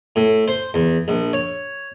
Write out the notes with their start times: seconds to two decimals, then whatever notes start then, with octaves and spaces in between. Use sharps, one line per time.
0.16 A2
0.48 C5
0.74 E2
1.08 A#1
1.33 C#5